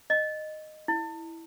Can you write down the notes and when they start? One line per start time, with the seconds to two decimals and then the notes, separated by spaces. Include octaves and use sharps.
0.10 D#5
0.88 E4